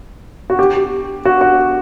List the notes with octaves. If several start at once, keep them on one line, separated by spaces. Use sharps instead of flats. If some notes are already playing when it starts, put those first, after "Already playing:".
F#4
G4
F#4
F#4